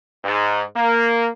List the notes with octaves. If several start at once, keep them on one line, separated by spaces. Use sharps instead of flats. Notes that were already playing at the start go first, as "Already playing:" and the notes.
G#2
A#3